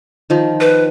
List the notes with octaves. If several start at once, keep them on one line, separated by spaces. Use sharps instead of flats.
D#3 F3
B4